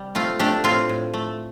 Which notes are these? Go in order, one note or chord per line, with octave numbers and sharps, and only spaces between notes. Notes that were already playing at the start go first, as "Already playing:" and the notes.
Already playing: C3 G3
A3 C4 F4
A3 D4 G4
A2 C4 F4
A2
A3